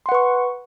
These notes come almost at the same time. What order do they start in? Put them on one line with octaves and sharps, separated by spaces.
C6 F#5 B4 C#6